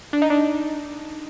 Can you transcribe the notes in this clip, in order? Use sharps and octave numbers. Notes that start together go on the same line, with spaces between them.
D4
D#4
D4